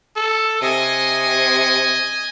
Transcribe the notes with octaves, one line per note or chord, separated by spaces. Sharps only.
A4
C3 D#5 G#5